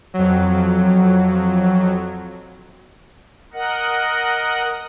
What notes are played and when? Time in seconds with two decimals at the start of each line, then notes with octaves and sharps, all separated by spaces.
0.14 F2 F#3
3.53 A#4 D#5 F#5